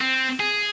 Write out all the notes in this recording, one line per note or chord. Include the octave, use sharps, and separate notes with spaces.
C4
G#4